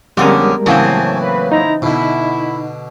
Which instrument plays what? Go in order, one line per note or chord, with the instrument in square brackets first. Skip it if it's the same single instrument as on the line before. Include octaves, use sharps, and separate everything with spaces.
[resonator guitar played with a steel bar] F2 D3 C#4 [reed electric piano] G3 G#3 A#4 [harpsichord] B3 D#6
[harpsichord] A2 F#3 A#3 [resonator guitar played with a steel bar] C#3 E3 C4 [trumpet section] G#5 A5
[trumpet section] B4
[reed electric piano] D#4 [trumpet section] E4 C5 A#5
[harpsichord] B2 D3 [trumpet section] E4